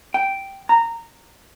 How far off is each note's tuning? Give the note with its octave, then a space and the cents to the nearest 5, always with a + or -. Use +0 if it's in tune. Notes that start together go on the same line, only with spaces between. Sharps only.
G5 -5
A#5 -15